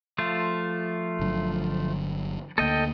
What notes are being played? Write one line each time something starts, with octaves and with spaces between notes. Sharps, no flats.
F3 A3 F4
G1 D3 F#3
D2 A#3 A4 D#5 G5